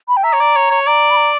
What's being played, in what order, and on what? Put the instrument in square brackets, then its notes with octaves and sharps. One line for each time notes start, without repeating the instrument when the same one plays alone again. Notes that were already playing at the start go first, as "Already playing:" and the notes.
[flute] B5
G5
[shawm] E5 [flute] A#5
[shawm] C#5
D5
C#5
C#5
[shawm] D5 [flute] A#5
[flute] B5
A#5